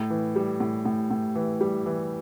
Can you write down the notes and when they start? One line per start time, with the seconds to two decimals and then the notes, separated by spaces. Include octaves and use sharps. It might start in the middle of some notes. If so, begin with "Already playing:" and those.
Already playing: A2
0.10 E3
0.36 G3
0.60 A2
0.85 A2
1.11 A2
1.36 E3
1.61 G3
1.86 E3